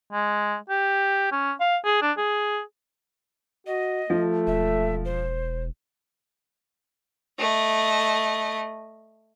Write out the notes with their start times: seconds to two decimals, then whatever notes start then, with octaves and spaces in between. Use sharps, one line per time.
0.13 G#3
0.70 G4
1.32 C#4
1.60 F5
1.85 G#4
2.02 D4
2.18 G#4
3.67 F#4 D#5
4.10 F3 A3
4.47 E1 E5
5.05 C5
7.39 A3 D#5